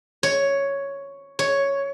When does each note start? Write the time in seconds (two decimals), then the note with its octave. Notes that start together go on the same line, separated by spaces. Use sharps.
0.23 C#5
1.39 C#5